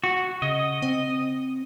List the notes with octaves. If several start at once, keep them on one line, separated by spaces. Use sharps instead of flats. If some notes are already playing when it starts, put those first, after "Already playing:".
F#4
C#3 D#5
C4